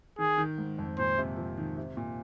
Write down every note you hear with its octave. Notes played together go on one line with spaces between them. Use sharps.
D#3 G#4
D#3
G#2
F2
A#2 C5
C3
F3
D#3
C3
A#2